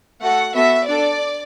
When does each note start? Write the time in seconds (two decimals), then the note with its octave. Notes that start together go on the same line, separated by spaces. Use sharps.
0.21 A3 F#4 A4 F#5
0.54 B3 F#4 A4 E5
0.87 D4 A4 D5